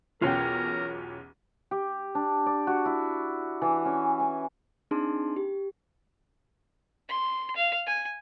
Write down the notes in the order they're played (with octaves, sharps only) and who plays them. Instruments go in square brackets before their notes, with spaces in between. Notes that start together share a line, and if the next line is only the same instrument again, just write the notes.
[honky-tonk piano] B1 E2 C#4 [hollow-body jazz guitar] F4 G5 [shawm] A#4
[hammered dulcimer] G4
D4
D5
F#4
E4
E3
C#4
G#5
[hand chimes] C4 D4 D#4 G#4 A5 C6
G4
[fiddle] C6
F5
G#5